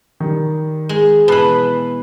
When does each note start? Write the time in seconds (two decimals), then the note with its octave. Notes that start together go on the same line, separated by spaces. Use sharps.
0.20 D#3 G3
0.89 G#3
1.28 B2 E3 B4 A5 C7 F#7